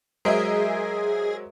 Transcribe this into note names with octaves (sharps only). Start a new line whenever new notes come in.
F#3 G#3 G#4 A#4 C5 D#5 E5